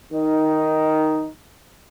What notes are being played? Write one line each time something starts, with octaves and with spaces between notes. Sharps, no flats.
D#3 D#4